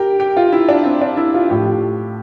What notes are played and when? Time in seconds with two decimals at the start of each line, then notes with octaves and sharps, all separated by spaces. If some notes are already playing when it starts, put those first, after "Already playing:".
Already playing: G4 A#4
0.20 G4
0.37 F4
0.52 E4
0.69 D4
0.85 C4
1.01 D4
1.17 E4
1.34 F4
1.50 A2 F3 G4